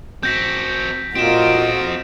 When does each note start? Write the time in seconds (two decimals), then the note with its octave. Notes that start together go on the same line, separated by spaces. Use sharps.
0.23 C4 F#4 G6 A#6 B6
1.15 A#2 C4 F4 F#4 D#5 D7 E7